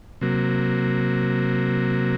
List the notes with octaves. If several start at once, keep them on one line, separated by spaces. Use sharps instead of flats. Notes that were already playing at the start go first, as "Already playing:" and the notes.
C3 F#3 A#3